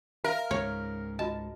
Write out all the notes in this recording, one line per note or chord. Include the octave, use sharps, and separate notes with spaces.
A#4 E5 F5 A#5
C#2 G#2 C#3 C#5
F4 F#4 D#5 A5